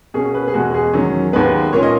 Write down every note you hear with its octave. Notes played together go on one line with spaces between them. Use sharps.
B2 A#3 C#4 G#4
B4
G#4
E2 B2 G#3 F#4
G#4
E2 D#3 F#3 C#4
D#2 D#3 G#3 B3 B4
A#2 A#3 C#4 C#5
D#5